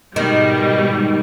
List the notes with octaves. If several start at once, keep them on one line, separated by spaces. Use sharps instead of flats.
G#2 B2 D#3 G3